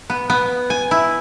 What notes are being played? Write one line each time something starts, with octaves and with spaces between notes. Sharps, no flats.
B3
B3
G#5
E4